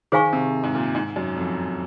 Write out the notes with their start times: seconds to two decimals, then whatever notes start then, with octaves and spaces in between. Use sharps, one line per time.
0.12 D#3 G#4 C5 F5 G#5 C#6
0.33 C3
0.63 G#2
0.75 A#2
0.95 G#2
1.16 F#2
1.36 F2